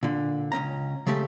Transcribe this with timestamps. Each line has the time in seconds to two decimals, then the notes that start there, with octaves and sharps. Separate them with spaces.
0.03 A#2 D3
0.52 C#2 F#2 C#4 A#5
1.07 C#3 G#3 A3 G4 A4